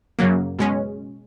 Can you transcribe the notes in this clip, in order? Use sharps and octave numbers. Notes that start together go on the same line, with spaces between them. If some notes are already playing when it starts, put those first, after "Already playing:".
F#2 C#3 F#3 A#3
B2 G#3 C#4